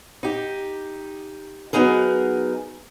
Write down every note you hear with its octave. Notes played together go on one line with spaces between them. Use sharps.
D#4 G4
F#3 G#3 B3 D#4 G#4 A#4